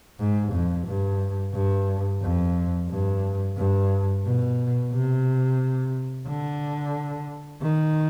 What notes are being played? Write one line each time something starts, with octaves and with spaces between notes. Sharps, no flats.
G#2
F2
G2
G2
F2
G2
G2
B2
C3
D3
D#3